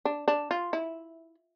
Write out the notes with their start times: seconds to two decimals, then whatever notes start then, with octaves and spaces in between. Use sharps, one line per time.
0.05 D4
0.28 D4
0.51 F4
0.73 E4